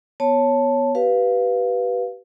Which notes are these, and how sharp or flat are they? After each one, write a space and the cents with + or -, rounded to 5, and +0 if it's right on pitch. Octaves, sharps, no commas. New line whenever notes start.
B3 +0 C#5 +0 A5 +0
G4 -30 B4 +0 F5 +0